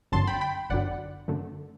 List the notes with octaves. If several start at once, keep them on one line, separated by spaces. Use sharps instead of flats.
G1 F#2 D3 F#3 A5 C6
G5 B5
G5 B5
G1 F#2 D3 F#3 D5 F#5
F#2 D3 A3